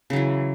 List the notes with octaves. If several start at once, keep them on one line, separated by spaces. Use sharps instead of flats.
C#3 E3 F#3